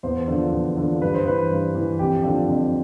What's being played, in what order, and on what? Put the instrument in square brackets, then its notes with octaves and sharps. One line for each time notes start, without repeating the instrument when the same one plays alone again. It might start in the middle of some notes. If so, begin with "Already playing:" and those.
[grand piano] E2 C5
D3 F3
E2
D3 F3
G2 B4
C5
E3 B4
G2
E3
F2 G4
D3 F3
F2